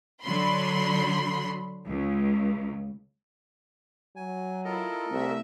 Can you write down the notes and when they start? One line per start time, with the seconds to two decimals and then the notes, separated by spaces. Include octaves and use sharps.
0.22 D3 F#3 B5 C6
1.88 C#2
4.16 F#3 G#5
4.65 E4 F4 A4 A#4 D#5
5.11 C2 A3 C4 E5